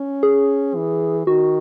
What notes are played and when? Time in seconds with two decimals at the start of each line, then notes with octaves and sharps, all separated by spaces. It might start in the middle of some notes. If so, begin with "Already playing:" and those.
Already playing: C#4
0.23 G#4
0.75 E3
1.27 D#3 F#4